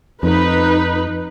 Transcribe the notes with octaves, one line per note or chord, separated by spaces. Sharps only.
F2 D#4 B4